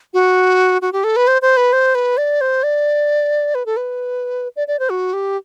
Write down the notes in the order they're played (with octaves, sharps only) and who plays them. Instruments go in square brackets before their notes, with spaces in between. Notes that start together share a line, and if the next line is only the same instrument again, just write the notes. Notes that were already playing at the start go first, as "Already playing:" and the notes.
[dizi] F#4
F#4
G4
A4
B4
C5
C5
B4
C5
B4
D5
C5
D5
B4
A4
B4
D5
D5
C5
F#4
G4